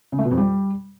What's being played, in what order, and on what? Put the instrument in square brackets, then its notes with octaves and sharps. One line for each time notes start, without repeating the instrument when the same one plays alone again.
[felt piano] C#3
A3
B2
F2
G3